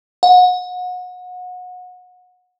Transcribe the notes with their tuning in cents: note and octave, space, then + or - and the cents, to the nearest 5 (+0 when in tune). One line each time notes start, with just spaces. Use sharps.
F#5 -30